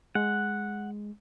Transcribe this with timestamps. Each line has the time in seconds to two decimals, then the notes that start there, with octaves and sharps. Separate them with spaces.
0.15 G#3 F#5